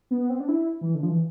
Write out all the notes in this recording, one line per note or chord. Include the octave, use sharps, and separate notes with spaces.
B3
C4
D4
E4
E3
D3
F3
E3